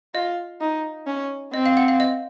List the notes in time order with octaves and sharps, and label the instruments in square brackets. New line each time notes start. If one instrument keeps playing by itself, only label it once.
[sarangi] F4 [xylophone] D#5
[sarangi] D#4
C#4
[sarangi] C4 [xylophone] D#5
[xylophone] F5
F#5
F5
D#5